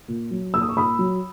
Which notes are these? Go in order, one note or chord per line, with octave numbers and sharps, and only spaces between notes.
A#2
F#3
A#2 E6
D#6
C#6
A#2 B5 D#6
F#3